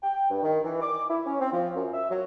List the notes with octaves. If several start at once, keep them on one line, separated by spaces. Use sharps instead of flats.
G5
G2
D#3
E3
D6
E4
C#4
C4
F3
F#2
E5
F#3